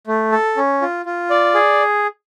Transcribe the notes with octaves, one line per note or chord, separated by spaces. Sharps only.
A3
A4
C#4
F4
F4
D5
G#4